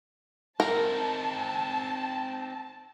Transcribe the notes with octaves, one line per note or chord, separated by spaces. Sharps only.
C4 D#4 A#4 A5